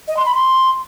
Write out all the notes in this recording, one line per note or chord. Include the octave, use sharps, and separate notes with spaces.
D#5
C6
B5
C6